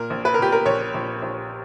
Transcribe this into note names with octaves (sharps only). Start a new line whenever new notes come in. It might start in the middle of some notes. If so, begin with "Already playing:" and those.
Already playing: A#2 A#4
A#1
B4
A#4
A#2 G4
A#4
A#1 C#5
A#1
A#1